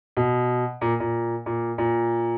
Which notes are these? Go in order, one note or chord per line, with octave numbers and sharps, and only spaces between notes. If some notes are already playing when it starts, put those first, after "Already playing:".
B2
A#2
A#2
A#2
A#2